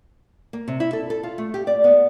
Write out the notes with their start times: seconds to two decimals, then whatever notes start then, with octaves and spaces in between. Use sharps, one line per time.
0.53 A#3
0.68 C3
0.80 E4
0.93 A4
1.10 A4
1.23 F4
1.38 A3
1.54 G4
1.67 D5
1.84 B3